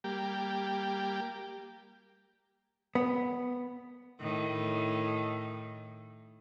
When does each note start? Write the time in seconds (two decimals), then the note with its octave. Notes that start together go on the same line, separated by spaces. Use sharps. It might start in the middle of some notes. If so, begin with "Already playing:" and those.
0.04 G3 A#3 G4
2.95 B3
4.21 A2 D#3